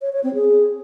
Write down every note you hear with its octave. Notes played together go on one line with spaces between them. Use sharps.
C#5
C#5
C4
G#4